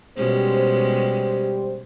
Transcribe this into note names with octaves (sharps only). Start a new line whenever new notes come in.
B2 G3 G#3 C#4 G4 C5